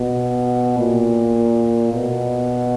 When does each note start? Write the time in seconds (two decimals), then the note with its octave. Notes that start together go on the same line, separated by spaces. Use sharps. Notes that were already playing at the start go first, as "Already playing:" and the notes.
Already playing: B2
0.78 A#2
1.93 B2